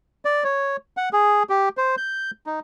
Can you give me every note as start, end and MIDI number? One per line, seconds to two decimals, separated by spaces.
0.25 0.44 74
0.44 0.77 73
0.97 1.09 78
1.13 1.43 68
1.50 1.69 67
1.77 1.95 72
1.97 2.31 91
2.46 2.60 63